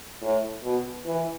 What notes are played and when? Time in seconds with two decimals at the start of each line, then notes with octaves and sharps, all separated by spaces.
0.22 A2
0.64 B2
1.06 E3